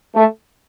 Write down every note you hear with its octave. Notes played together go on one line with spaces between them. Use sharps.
A3